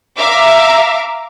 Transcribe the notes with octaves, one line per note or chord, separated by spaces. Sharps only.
E5 F5 A#5 D6